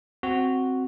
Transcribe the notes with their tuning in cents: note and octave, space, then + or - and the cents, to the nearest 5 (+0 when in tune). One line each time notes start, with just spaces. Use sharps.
C4 +0 F#4 +0